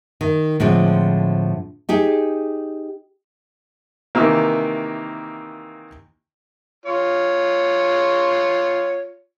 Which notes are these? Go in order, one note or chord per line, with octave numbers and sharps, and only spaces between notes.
D#3
A2 D3 F3 G#3 C4
D#4 G4 G#4
C3 D#3 E3 A#3
F4 C#5